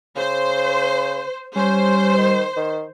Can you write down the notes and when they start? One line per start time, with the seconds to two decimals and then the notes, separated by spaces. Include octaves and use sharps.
0.16 C#3 C5
1.56 G3 C#4 C5
2.18 D#3
2.57 D#3